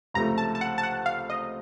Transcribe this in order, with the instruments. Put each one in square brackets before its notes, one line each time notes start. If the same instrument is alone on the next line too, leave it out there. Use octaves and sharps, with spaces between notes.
[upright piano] C#2 C3 F3 A3 [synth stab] A#5
[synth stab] A5
A5
F#5
A5
F#5
F5
D#5